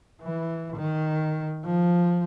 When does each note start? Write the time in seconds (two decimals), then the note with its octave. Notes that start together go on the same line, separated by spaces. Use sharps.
0.22 E3
0.76 D#3
1.65 F3